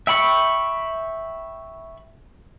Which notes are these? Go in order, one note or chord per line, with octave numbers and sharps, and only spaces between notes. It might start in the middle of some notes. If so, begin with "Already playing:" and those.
E5 G5 B5 C#6